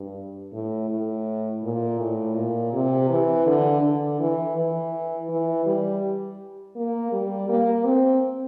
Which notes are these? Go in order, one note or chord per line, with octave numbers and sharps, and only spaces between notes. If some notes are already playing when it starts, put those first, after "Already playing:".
Already playing: G2
A2
A2
A#2
A2
A#2
C3
E3
D3
D3
E3
E3
E3
G3
A#3
G3
A#3
C4